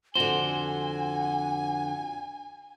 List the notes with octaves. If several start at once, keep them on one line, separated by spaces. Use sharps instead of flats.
F2 D3 F#4 C5 F#5 G#5